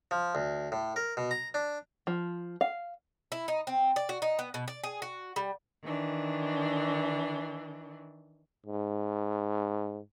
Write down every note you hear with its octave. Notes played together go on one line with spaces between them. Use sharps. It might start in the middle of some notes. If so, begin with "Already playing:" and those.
F3
D2
A2
A#4
B2
A#5
D4
F3
F5
E4
D#4
C4
D5
F#4
D#4
B3
B2
D5
G#4
F#4
G3
D#3 E3 D4
G#2